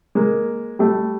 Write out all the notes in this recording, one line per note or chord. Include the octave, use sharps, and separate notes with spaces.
G#3 A#3
G3 A3